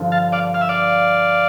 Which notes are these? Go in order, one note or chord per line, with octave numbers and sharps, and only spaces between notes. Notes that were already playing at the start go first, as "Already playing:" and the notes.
Already playing: G2 D3 F3
F5 A5
D5 F5
F5
E5
D5 F5